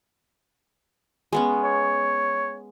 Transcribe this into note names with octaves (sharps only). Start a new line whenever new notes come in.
G#3 B3 C#4
C#5